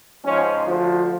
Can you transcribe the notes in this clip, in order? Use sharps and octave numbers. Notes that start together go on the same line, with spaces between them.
G#2 F3 C#4
D2 D3 F3